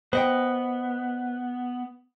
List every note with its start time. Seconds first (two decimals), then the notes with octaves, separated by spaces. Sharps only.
0.13 B3 C5 D#5 G5